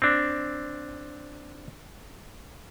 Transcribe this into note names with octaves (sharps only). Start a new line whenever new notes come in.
C4 D4